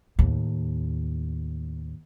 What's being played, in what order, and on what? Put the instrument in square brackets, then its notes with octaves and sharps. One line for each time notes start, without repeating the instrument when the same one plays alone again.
[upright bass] D#2 A2